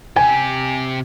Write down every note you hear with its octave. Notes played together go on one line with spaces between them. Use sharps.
C3 G4 G#5